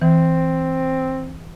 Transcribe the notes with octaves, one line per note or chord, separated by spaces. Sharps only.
E3 C4